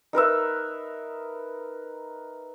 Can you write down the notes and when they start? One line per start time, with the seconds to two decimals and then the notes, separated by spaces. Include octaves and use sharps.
0.13 D#4 A#4 B4 E5